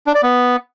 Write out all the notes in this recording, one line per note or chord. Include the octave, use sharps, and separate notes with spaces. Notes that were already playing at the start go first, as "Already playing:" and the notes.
D4
D5
B3